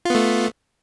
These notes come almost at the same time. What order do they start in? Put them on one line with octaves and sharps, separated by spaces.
F4 B3 A3